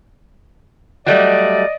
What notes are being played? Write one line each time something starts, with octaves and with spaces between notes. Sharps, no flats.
F#3 G3 A3 D5 D#5